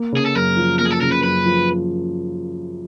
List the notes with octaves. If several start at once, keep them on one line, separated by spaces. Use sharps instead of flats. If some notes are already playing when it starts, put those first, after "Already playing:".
Already playing: A#3
C#3 G#4
A4
F#2 A#4
F3
A#3 A#4
G#4
A4
C#3 A#4
B4
F#2 B4
F3